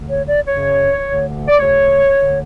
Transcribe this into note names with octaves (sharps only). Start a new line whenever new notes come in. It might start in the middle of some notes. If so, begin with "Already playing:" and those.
Already playing: D2 D3
C#5
D5
F#2 C#3 C#5
D2 D3
D5
D2 C#3 C#5
D2 D3